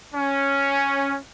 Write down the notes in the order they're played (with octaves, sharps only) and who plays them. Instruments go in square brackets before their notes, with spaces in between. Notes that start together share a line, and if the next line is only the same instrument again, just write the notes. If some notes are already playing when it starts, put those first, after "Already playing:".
[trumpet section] C#4